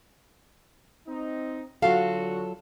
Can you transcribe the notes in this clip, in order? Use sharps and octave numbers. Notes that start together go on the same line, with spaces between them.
C4 D#4
D3 F#3 F4 F#4 A4 F5